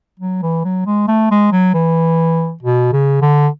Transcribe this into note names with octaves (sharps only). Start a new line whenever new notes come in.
F#3
E3
F#3
G#3
A3
G#3
F#3
E3
B2
C#3
D3